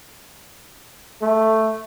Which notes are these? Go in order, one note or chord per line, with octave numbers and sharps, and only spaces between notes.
A3